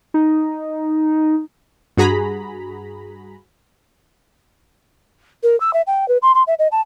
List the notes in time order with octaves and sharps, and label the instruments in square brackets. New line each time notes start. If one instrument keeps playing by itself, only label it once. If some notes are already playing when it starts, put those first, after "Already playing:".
[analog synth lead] D#4
[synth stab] G2 F#4 G#4 A#5 B5
[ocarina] A#4
E6
E5
G5
B4
C6
C6
E5
D#5
A5